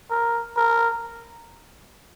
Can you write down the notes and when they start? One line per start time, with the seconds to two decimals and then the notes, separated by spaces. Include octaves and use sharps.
0.10 A#4
0.57 A#4